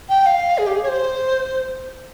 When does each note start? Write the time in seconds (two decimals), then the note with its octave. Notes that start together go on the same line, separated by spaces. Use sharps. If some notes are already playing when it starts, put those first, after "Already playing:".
0.09 G5
0.26 F5
0.58 G#4
0.67 G4
0.74 G#4
0.83 C#5
0.88 C5